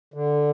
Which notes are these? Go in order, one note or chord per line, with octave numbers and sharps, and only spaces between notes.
D3